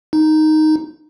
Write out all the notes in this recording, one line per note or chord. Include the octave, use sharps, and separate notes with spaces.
D#4